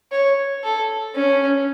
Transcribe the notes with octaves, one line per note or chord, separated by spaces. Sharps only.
C#5
A4
C#4